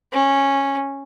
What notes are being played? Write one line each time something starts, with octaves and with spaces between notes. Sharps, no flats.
C#4